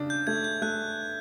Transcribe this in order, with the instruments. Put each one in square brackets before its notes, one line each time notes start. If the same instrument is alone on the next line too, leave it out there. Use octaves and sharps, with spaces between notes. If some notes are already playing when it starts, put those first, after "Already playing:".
Already playing: [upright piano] C#3 D4
[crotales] G6
[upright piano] A3 [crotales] G#6
[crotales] G6
[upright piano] A3 [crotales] F#6